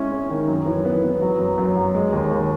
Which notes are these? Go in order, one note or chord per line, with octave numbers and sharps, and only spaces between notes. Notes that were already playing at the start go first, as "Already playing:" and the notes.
Already playing: G#3 C#4 E4
C#4
D#3
F#2
E3
B3
B3
F#3
F#2
F#2
F#3
G#3
D#2
D#2